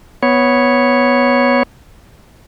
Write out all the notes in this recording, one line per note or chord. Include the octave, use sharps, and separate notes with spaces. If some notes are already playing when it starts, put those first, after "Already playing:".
B3 C#5